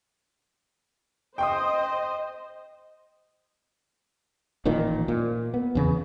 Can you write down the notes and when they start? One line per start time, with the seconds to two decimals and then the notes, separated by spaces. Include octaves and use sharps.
1.38 C5 D#5 G5 C6 D#6
4.65 A1 A#2 D#3 F3
5.08 A#2
5.54 B3
5.75 E2 C#3